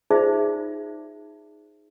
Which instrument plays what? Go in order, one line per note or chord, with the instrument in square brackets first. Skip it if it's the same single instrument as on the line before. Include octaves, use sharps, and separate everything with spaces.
[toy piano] D#4 F4 G#4 C5 D5 E5